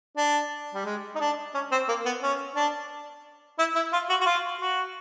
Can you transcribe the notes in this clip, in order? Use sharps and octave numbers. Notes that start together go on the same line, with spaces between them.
D4
G3
G#3
D#4
D4
C#4
C4
A#3
B3
C#4
D4
E4
E4
F4
F#4
F#4
F4
F#4